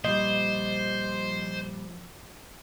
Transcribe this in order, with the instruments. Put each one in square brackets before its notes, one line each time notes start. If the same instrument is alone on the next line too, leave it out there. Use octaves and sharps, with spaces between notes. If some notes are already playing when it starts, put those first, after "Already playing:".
[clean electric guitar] A#2 G3 [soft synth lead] F3 [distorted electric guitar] C5 [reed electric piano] D#5